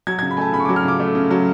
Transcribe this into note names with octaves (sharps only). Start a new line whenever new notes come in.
F#3 G#6
G#6
C#3
B5
A3 G#5 A5
C#3 B5
C#6
D6
F#3
F6
C#3 D6
A3
C#3
F#3